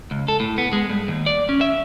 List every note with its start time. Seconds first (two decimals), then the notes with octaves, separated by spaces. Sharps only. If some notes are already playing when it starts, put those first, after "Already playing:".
0.11 C#2
0.28 A4
0.40 A2
0.58 B3
0.73 G#3
0.90 G2
1.08 D#2
1.26 D5
1.49 C#4
1.61 E5